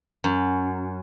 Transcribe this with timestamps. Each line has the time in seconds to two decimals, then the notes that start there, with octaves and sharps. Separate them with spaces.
0.24 F#2